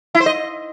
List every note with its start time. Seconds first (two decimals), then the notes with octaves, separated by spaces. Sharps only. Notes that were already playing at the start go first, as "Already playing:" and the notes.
0.15 E4
0.20 C5
0.26 D#5